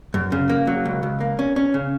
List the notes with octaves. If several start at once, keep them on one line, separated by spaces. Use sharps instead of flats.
F#2
C#3
A#3
F#3
C#2
C#2
A#3
C#4
C#4
C#3